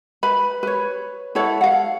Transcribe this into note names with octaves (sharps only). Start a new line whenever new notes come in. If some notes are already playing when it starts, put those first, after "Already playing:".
B4 B5
B4 C#5
E4 A4 C#5 F#5
F5 F#5